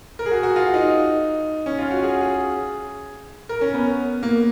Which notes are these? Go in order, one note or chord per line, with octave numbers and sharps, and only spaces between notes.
A#4
G#4
F#4
F#4
F4
D#4
C#4
F4
F#4
G#4
G#4
A#4
C#4
B3
A#3